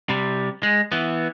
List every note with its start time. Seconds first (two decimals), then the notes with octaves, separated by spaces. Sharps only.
0.09 C3 G3
0.63 G#3
0.92 E3 B3